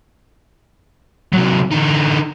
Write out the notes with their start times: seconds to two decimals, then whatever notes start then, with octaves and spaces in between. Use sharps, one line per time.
1.32 C3 F#3
1.71 D3 D#4